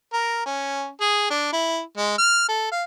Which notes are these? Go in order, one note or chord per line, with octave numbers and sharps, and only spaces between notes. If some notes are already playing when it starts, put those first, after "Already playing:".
A#4
C#4
G#4
D4
E4
G#3
F6
A4
F5